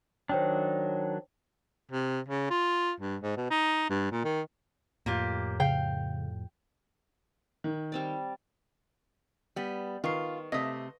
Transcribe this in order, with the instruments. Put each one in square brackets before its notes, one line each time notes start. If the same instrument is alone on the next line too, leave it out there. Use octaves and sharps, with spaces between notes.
[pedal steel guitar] D#3 F#3 D4 [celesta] C5 C#5 G5
[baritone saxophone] C3
C#3
F4
G2
G#2
B2
D#4
G2
A#2
D#3
[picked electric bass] F2 A2 [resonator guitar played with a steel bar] A#3 F4 G4
[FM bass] C#3 [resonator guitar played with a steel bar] F5 [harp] G5
[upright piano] D#3
[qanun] G3 C4 D5
[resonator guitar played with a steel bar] G3 B3
[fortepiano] D#3 [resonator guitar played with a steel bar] F4 [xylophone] B4 C#6 C7
[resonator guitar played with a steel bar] C3 A3 [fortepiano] D#5 D#6 [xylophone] A#6